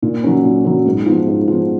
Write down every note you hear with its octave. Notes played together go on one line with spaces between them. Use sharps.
A#2
F#3 C#4
A#2
F#3 C#4
G#2
F3 B3
G#2
F3 B3